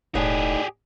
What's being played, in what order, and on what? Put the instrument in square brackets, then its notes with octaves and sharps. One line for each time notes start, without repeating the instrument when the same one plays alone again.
[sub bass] E1 [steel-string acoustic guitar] A2 D#4 F#5 [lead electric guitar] G4 G#4 [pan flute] D5